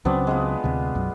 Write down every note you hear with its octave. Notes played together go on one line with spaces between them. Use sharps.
C#2 C#3 F#3 B3 C4 D4
G#3 B3 F4
D2 C3
B1 F#2